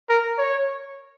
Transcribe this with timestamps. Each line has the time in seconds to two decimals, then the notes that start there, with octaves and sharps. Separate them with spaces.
0.09 A#4
0.38 C#5